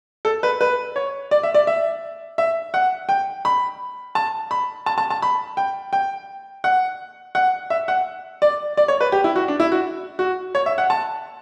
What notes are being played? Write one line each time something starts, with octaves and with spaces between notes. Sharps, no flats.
A4
B4
B4
C#5
D5
E5
D5
E5
E5
F#5
G5
B5
A5
B5
A5
A5
A5
B5
G5
G5
F#5
F#5
E5
F#5
D5
D5
C#5
B4
G4
E4
F#4
D4
E4
F#4
F#4
C#5
E5
F#5
A5